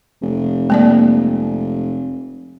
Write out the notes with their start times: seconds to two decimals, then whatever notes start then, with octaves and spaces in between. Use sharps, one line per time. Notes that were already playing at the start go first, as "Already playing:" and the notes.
0.22 F1
0.70 G#3 A#3 D5